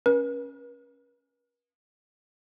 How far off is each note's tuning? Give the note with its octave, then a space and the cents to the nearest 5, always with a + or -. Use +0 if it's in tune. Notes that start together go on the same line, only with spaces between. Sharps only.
C#4 +0 B4 -45